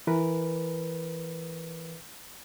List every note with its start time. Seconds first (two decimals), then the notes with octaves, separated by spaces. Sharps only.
0.07 E3 A#4 B4